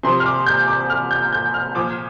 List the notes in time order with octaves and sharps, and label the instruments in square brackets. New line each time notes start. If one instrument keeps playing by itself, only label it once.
[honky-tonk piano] C3 F3 C6
F6
D6
G6
D6
F6
G6
G6
F6
A#2 F3 D6